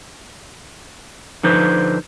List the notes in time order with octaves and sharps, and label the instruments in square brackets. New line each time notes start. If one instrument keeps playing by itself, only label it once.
[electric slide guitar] D3 F3 D#4 B4 C5